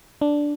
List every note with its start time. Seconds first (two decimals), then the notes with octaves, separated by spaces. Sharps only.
0.21 D4